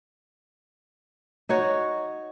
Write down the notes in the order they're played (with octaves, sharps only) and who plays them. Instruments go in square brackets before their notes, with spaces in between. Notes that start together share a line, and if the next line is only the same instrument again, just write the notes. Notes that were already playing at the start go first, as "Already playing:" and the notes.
[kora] D#4 F#4 C#5